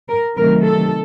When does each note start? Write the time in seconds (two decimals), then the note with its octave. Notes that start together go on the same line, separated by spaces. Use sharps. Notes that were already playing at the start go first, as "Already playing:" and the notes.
0.08 A#4
0.37 C3 D#3 F#3 A3 A#4
0.64 A4